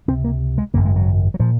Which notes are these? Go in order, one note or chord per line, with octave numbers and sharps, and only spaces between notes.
C#2 C3 C4
A#3
G#3
G#1 F#2 C#3 A#3
G#3
F#3
F#3
A#2 F3